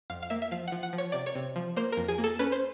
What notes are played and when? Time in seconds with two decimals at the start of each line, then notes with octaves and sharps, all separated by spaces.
0.10 F2 F5
0.23 F5
0.30 A#3 E5
0.42 E5
0.51 F3 F5
0.68 F3 F#5
0.83 F#5
0.93 F3
0.98 C#5
1.12 C3 D5
1.26 C#5
1.35 C3
1.56 F3
1.77 A#3 C5
1.92 A#4
1.97 F2
2.08 G#4
2.18 A#3
2.24 A4
2.39 C#4 B4
2.52 C5